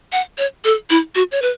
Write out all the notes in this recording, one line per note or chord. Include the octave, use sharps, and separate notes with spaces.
F#5
C#5
A4
E4
F#4
C#5
B4